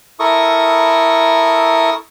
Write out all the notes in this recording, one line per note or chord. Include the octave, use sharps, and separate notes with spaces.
E4 A4 A#4 C#6 D#6